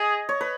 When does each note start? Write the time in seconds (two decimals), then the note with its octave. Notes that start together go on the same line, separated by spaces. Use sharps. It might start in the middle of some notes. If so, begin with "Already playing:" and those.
Already playing: G#4 D#5
0.29 C#5
0.41 B4